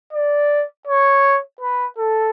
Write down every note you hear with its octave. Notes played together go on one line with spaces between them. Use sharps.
D5
C#5
B4
A4